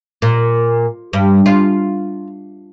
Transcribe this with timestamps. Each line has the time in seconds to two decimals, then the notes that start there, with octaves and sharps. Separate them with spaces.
0.22 A#2
1.13 G2
1.46 F4